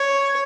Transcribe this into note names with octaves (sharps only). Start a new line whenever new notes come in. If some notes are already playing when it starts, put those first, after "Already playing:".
Already playing: C#5